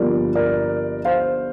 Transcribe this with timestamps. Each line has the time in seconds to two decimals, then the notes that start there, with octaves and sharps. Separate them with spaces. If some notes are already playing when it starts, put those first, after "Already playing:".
Already playing: G1 G2 F3 A#3 A#4 D5
0.35 A#4 D5
1.05 C5 F5